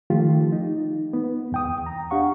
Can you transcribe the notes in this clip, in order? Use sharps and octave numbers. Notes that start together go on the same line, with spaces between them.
D#3 F3 A3 F4 G4
D#4
B3
E2 G5 D#6
A#5
D4 G4 F5 F#5 C#6